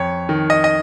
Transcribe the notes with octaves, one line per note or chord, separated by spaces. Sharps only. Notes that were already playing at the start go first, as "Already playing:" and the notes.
Already playing: F2 C#5
D#3
D#5
D#5